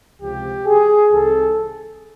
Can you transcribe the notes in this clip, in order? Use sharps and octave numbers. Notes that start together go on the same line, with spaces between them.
C#2 C3 F3 G4
G#4
C2 C3 D#3 A4